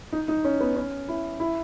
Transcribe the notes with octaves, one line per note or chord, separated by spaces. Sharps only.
D#4
D#4
C#4
B3
C#4
E4
E4